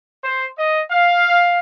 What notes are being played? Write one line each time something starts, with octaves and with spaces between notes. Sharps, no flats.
C5
D#5
F5